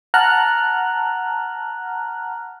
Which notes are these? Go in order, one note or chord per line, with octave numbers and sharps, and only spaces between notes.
F#5 A5 A#5 F6 F#6